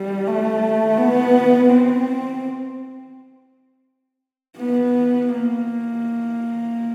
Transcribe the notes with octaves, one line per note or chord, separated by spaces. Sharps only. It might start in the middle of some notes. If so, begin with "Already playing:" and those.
Already playing: G3
A3
B3
C4
B3
A#3